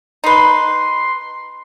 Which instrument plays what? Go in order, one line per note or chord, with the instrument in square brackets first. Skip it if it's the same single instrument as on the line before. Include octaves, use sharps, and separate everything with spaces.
[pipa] D#4 B4 [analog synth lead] C6